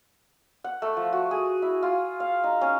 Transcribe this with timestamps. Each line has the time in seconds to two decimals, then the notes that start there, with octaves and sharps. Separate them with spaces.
0.64 F#5
0.82 A3
0.97 F3
1.13 F#4
1.31 G#4
1.62 E4
1.83 F4
2.20 F5
2.44 D#4
2.61 C#4